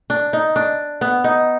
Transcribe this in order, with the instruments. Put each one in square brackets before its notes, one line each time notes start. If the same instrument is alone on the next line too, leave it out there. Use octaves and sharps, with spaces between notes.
[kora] D4
D#4
D4
B3
D#4